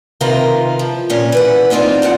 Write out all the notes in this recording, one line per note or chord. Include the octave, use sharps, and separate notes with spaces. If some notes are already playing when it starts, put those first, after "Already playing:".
C3 D#3 F4 A#4 B4
F3
A#2 C#4
E3 B4 F#5
A#3 C4 D#4 F4 D5
F#2 A#2 F#4 F#5